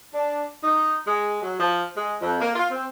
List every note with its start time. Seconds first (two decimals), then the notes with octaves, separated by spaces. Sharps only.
0.14 D4
0.64 D#4
1.07 G#3
1.42 F#3
1.60 F3
1.97 G#3
2.21 F2
2.41 A#3
2.56 F4
2.71 C4